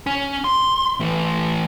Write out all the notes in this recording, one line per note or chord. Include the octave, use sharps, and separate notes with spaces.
C#4
C6
E3 A3